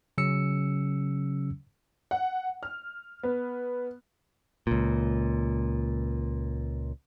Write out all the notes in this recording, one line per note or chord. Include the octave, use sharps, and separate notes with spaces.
C#3 F#3 C#4 E6 C#7
F#5
F6
B3
C#2 A#2